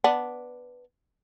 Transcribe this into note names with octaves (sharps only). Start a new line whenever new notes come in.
B3 D4